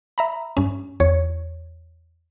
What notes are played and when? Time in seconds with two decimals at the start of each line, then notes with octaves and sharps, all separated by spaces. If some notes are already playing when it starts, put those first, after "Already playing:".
0.18 E5 A#5 B5
0.57 G2 C#4
1.00 E2 C#5